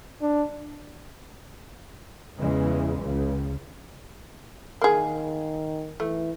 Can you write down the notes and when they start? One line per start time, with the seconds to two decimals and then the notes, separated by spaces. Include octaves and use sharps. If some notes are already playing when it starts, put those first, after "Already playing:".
0.22 D4
2.39 E2 C#3 E3 G#3
3.01 C#2 C#3
4.81 D#3 A#3 G#4
6.00 E3 A3